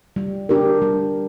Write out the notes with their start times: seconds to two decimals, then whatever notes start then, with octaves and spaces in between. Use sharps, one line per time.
0.16 G3
0.49 D4 G4 A#4
0.82 G3